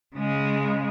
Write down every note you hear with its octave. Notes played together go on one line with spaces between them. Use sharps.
C#3 G#3